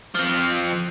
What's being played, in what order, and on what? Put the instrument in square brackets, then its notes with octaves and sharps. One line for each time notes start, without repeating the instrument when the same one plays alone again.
[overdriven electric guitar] F3 C4